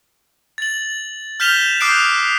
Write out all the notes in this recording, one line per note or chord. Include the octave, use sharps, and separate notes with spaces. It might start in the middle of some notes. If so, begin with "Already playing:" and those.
A6 F#7
F6 G6 B6 E7 F7 G7
D6 D#6 F#6 G6 C7 D7